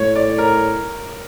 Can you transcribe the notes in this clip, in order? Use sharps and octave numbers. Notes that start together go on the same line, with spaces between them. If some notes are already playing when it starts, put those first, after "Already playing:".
Already playing: A2 C#5
D5
A#4